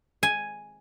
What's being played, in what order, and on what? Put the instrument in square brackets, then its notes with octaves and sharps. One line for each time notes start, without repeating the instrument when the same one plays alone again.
[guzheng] G#5